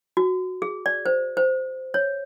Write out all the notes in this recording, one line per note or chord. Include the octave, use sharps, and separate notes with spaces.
F#4
G#4
D5
C5
C5
C#5